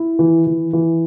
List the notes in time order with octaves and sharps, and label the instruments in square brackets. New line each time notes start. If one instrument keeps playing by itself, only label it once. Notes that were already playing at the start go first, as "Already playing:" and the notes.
Already playing: [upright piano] E4
E3
E3
E3